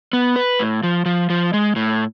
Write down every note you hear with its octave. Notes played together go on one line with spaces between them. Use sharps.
B3
B4
A2
F3
F3
F3
G#3
A2